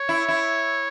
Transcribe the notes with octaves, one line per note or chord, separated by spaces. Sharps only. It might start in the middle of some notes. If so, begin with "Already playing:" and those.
Already playing: C#5
E4
E4